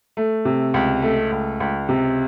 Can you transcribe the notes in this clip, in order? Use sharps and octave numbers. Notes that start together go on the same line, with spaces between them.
A3
C3
C#2
A3
C#2
C#2
C3